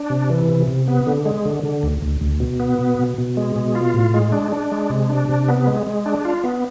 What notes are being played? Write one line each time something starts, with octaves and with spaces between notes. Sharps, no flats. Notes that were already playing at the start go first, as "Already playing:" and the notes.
Already playing: D4
C3
E3
C3
C3
B3
D3
G#3
D3
D3
D2
D2
D2
B2
B3
B2
B2
B2
G#3
B2
F4
A2
G#3
D4
D4
G#3
C3
D4
C3
B3
G#3
G#3
D4
F4
B3